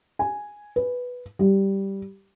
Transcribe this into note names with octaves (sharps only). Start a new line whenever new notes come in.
G#5
B4
G3